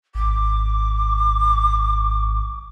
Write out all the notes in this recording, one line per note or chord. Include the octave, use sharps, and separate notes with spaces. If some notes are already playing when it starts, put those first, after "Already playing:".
G#1 D6